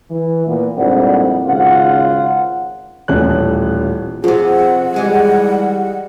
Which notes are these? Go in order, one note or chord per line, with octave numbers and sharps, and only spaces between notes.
E3
A#2 B3
A#1 F2 G#2 G3 E4 F#5
G#1 C#3 F4 F#5
D#1 A1 A3 C#4 F#6
F2 C3 F3 G#4 F#5
E3 G3 G#3 G#4